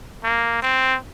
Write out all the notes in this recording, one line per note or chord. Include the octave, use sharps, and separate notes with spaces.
A#3
C4